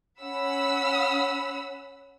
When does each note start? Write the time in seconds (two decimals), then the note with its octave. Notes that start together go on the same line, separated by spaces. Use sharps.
0.21 C#4 F#5 B5 E6